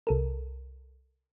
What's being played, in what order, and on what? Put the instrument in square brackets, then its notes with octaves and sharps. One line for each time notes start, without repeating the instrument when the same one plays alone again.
[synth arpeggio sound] C2 A4 A#4